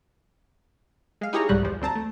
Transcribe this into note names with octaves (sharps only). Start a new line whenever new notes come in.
G#3 F5
D#4 E4 G4 G#4 C#5 A#5
C2 G#2 B2 G3 G#3 F#6
E2 F3
D2 C4 A5 A#5
A3